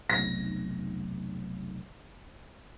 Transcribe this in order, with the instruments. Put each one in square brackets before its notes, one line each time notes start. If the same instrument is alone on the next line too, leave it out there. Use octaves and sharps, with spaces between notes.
[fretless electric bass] F1 B1 [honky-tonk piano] A#6